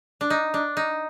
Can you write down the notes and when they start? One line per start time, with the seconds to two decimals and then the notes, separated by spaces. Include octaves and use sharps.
0.21 D4
0.30 D#4
0.54 D4
0.77 D#4